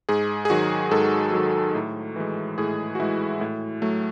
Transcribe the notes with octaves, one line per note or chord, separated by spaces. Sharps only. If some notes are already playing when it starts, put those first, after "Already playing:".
G#2 G#4
G#4
D#3 F#3 F#4
G#2 A4
D#3 F#3
A2
E3 G#3
A2 G#4
F#4
E3 G#3 E4
A2
F#3 A3